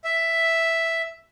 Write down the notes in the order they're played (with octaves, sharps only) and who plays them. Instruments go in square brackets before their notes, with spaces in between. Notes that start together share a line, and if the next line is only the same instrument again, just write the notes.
[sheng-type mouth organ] E5